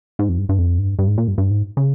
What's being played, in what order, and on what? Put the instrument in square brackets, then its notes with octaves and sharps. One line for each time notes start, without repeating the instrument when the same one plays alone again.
[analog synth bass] G#2
F2
G2
G2
F2
G2
G2
G#2
A#2
G2
G2
G#2
C#3